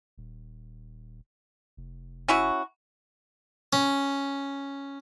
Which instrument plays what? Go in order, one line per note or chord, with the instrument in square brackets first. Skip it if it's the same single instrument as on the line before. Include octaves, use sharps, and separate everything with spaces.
[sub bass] D#1
F1
[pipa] C#4 E4 F#4
[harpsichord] C#4